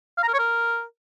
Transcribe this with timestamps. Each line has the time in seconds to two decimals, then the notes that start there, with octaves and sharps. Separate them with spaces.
0.18 F5
0.23 A#5
0.28 A#4
0.34 C#5
0.39 A#4